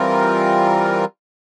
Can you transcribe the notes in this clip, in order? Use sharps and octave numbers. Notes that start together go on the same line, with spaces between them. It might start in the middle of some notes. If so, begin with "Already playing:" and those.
Already playing: E3 G3 C4 F4 A#4